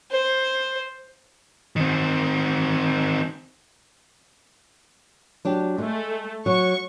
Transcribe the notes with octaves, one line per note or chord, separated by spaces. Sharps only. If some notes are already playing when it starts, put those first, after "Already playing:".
C5
D#3 C4
F#3 D4 G4
G#3 A3
F#3 C#6